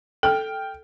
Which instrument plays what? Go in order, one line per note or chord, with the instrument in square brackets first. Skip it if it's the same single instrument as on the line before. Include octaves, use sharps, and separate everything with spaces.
[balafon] A4 [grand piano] G5 F6